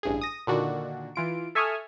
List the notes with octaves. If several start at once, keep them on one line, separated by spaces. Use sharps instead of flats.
A1 G2 G#4
D#6 A#6
A#2 D3 D#3 D4 F#4
E3 F4 D7
A4 E5 G#5 C#6 D#6 F6